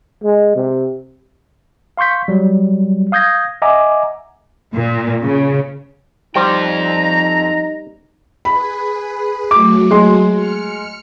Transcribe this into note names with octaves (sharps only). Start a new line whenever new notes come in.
G#3
C3
F5 C6 C#6 G6 B6
F#3 G3
F5 D#6 G6 G#6 A#6
D#5 E5 F#5 G#5 A#5 D6
A#2
C#3
F2 F3 G3 D#4 C5 G5 A#5
G#4 B4 B5
F#3 A3 F#4 D6
G#3 C6
F6 C#7